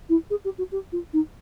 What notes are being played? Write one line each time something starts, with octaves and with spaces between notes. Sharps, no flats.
E4
G#4
G4
F#4
G4
F4
D#4